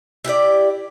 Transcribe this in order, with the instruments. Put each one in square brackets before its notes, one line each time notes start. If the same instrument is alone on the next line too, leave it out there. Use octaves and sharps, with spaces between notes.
[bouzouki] E4 G4 B4 D5